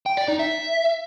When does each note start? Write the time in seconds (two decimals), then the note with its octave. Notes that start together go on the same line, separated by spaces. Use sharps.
0.06 G5
0.17 D5
0.28 D#4
0.39 E5